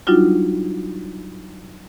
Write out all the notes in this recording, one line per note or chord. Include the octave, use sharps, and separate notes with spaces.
F#3 G3 D4 D#4 F4 F#4